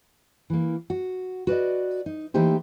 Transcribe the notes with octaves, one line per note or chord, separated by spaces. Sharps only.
E3 A#3
F#4
F#4 B4 D5 D#5
D#4
E3 A3 A#3 D#4 G4 C5